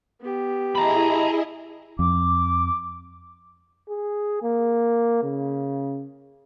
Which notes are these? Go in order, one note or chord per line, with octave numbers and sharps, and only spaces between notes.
B3 G4
E4 G#4 D#5 A#5 B5
F2 D6
G#4
A#3
C#3